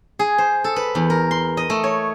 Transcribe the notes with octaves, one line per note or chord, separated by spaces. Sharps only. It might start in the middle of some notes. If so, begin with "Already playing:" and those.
G#4
C5
A4
B4
E2
A#4
C6
D#5
A3
C#5